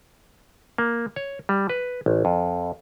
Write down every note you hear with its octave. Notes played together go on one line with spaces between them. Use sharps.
A#3
C#5
G3
B4
A1
F2